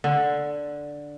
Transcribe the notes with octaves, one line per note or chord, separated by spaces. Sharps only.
D3